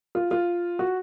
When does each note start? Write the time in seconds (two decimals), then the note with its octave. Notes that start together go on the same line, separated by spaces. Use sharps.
0.15 F4
0.31 F4
0.79 F#4